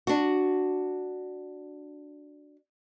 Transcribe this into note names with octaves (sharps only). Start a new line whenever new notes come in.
D4 F#4